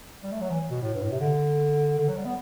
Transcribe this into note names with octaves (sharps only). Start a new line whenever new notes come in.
G3
A3
F#3
E3
B2
A2
G2
A2
C3
D3
D3
F#3
G3
B3